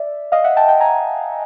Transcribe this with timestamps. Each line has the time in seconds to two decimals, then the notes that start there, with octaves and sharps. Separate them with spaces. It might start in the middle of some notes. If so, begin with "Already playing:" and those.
Already playing: D5 E5
0.32 D#5 F5
0.44 E5 F#5
0.56 G5 A5
0.69 G5 A5
0.80 G#5 A#5